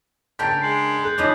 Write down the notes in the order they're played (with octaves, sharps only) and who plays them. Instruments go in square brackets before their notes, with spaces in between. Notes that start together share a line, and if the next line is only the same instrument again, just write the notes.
[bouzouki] C#3 D4 A#4 [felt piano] G5 G6 [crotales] A6 B6
[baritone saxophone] G#3 [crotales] C7 F#7
[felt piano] G#4 [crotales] F#6 G6
[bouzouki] E3 F3 G#3 [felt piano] C#4 D#4 [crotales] D6 F#6